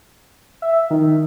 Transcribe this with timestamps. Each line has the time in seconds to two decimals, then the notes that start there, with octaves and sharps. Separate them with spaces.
0.62 E5
0.90 D#3